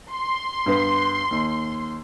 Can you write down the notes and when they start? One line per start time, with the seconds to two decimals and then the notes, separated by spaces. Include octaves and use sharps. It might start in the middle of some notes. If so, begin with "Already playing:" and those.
0.10 C6
0.66 G2 B3 B4
1.31 D#2